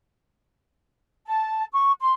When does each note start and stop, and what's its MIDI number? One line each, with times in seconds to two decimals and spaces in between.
1.27 1.65 81
1.72 1.93 85
2.01 2.11 84